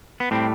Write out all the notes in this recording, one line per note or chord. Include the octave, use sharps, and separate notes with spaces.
B3
A2 G3 C4